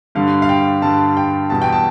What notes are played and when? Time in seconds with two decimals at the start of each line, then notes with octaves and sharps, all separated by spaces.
0.15 G2 D3 G3 F5
0.42 F5
0.49 G5
0.82 G2 D3 G3 A5
1.17 G5
1.50 E2 B2 G3 A5
1.62 G5
1.72 A5